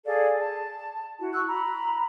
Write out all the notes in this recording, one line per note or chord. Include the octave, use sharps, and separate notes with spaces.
G#4 A4 D5 F5
A5
E4 F#4
C#6 E6 F#6
A#5 B5